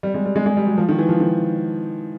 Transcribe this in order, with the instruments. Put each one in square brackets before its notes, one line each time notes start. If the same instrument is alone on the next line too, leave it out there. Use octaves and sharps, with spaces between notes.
[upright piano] G3
G#3
G3
G#3
G#3
G3
F#3
F3
D#3
E3
F3
D#3